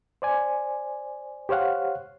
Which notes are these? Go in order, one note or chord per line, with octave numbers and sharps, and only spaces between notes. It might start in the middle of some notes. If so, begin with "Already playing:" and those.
C5 D5 G#5
G4 C5 C#5 F5 F#5